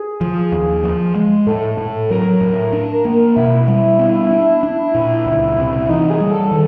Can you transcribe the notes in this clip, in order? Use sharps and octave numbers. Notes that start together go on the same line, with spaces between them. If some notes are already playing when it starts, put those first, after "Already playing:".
Already playing: G#4
F3
D#2
F3
G#3
A2 A4
A2
F#3 A#4
A2
D4
A#3
B2 E4
G3
B3
D4
D4
A#2
C#2
C3
E3 D#4
G#4
G3
A4
D#3